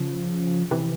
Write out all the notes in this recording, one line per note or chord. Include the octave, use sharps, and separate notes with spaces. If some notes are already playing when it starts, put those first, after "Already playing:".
Already playing: C#3 F3
C3 E3